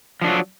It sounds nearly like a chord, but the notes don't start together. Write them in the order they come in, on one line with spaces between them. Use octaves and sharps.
F3 D4 F#3